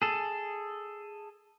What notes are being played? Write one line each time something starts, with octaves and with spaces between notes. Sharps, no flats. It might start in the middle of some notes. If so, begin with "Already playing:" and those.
G#4 A4